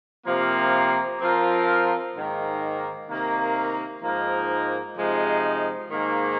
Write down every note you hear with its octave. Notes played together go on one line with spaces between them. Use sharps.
C3 F3 A#3
F3 C4 F4 A#4
G#2 D#3 A#3
C3 D#3 A#3 D#4
G#2 F3 A#3 D#4 A#4
C3 F3 G#3 D#4
G#2 D#3 A#3